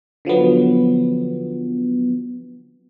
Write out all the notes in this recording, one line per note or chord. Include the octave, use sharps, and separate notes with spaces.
D3 F3 F#3 B3